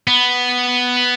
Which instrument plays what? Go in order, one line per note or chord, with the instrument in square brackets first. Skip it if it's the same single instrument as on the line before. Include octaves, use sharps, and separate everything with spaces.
[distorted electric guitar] B3